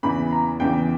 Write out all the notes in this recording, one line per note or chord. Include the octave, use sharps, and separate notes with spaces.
E2 C#3 E3 B5
A#5
E2 C#3 E3 G5